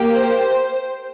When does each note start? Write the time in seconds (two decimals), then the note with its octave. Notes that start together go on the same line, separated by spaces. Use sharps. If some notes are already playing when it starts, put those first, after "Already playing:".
Already playing: A#3 G4
0.13 C5